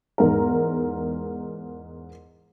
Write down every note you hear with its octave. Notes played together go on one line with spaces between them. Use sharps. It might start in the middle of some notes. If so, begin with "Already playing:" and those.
E2 G#2 A#4